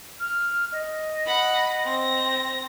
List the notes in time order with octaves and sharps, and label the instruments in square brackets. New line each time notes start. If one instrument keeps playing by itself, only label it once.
[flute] F6
D#5
[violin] F#5 B5
C4 A#6